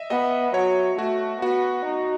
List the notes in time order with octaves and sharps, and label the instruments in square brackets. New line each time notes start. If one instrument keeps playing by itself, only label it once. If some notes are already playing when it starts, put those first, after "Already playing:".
Already playing: [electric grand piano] D#5 E5
[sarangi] B3 [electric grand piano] D#5
[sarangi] F#3 [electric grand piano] C#5
[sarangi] A3 [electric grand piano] F#4
[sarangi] B3 [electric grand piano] F#4
[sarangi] D#4